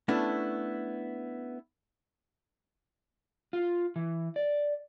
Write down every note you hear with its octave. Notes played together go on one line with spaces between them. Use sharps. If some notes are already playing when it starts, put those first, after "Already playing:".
A3 B3 C#4 D4 E4
F4
E3
D5